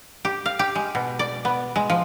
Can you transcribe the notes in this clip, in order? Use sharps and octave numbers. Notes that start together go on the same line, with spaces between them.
G4
F5
G4
G#3
B2
D5
B3
G#3
F3